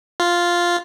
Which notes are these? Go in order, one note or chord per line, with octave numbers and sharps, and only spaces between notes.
F4